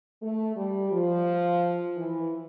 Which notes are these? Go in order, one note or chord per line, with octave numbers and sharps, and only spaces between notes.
A3
G3
F3
E3